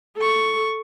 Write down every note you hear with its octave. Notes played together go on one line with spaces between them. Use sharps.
A4 C#6